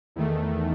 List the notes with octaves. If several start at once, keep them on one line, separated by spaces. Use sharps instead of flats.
E2 D#3 A3